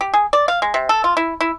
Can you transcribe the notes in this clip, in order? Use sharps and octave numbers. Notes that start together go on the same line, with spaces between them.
G4
G#4
D5
F5
G#3
C3
A4
F4
E4
E4